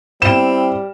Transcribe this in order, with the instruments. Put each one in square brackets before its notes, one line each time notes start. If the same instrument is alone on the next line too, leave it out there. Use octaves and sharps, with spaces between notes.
[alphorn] G3 [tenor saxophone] C4 [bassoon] E4 [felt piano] E7